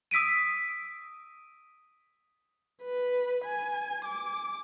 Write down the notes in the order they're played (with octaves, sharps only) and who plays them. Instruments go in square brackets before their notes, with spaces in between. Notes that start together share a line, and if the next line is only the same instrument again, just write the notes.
[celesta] D#6 E6 B6 D7 D#7
[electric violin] B4
G#5
D6